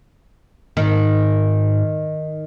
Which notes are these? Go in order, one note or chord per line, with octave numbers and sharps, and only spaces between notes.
G#2 D#3